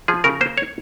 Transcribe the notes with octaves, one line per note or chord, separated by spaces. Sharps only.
F3 G#4
C#3 A#4
A#3 C5
C#5